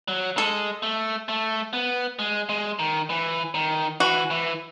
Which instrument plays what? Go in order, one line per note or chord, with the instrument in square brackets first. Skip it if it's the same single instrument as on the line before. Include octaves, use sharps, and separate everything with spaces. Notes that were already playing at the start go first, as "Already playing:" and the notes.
[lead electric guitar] F#3
[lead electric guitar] G#3 [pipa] A4
[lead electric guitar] A3
A3
B3
G#3
G#3
D#3
E3
D#3
[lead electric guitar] E3 [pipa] F#4
[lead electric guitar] E3